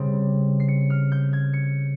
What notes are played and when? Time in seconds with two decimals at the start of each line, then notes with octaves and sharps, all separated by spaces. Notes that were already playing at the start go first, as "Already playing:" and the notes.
Already playing: C#3 G3 C4
0.60 C7
0.68 C#7
0.90 F6
1.12 G6
1.33 G#6
1.53 C#7